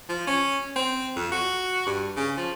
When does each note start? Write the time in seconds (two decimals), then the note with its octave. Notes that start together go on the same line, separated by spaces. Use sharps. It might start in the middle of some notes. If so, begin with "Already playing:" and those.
0.09 F3
0.27 C#4
0.76 C4
1.16 F2
1.32 F#4
1.87 G2
2.17 C#3
2.37 F3